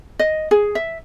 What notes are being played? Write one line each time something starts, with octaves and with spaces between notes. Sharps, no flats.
D#5
G#4
E5